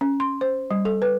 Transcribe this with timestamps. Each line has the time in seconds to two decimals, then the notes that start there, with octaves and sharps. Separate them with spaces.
0.01 C#4
0.20 C6
0.41 C5
0.71 G3
0.85 A4
1.02 B4